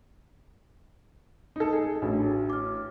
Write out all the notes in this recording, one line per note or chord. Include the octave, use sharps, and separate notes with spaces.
D#4 A4
G#4
A1 D4 F#4
D6 F6